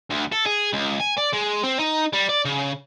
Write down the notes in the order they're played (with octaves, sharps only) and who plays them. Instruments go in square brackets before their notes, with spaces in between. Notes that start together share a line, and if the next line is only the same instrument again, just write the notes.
[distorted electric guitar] D2
A4
G#4
C#2
G#5
D5
G#3
C4
D#4
G3
D5
C#3